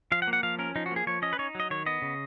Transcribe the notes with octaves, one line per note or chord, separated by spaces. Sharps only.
F3 F5
F#5
A#3
F#5
F3 F5
C#4 A#4
F3 D#4
F#4
A#3 G#4
F3 C#5
C#4 D#5
B4
D#4 C#5
F#3 D#5
D#3 C#5
B3 D#5
C#3